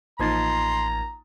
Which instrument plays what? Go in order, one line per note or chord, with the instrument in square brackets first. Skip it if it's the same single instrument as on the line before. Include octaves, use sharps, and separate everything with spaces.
[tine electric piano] A1 G#6 A6 [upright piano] F3 A#3 D#4 [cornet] A#5 [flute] C6